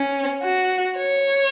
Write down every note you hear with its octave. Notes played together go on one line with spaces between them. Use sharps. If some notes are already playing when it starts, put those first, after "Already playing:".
Already playing: C#4
F#4
C#5